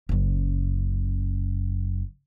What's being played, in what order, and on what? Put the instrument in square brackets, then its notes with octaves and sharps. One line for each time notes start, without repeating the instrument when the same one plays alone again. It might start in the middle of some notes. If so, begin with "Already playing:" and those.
[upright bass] F#1 F#2